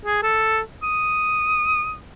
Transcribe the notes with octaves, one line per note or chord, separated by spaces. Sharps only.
G#4
A4
D#6